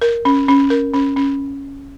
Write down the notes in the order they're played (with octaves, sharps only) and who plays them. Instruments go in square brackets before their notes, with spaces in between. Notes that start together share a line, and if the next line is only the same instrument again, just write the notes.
[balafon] A#4
C#4
C#4
A#4
C#4
C#4